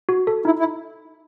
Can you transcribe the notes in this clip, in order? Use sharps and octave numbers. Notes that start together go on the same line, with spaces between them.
F#4
A4
D#4 E4
E4
D#4